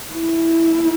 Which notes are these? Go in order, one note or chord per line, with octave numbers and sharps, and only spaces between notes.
E4